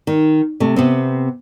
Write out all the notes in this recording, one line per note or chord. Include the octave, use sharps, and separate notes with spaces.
D#3
C3 A3
C3 B3 C4